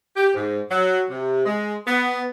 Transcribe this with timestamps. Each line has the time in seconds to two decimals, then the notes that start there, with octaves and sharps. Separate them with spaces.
0.16 G4
0.34 G#2
0.71 F#3
1.10 C3
1.45 G#3
1.86 B3